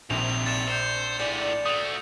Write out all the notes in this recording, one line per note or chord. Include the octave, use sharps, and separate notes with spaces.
A#1 C3 D#3 F7
A#2 A6 C#7 E7
C5 G6 C#7 F7
A2 G#4 D5
A3 F#4 D#6 F7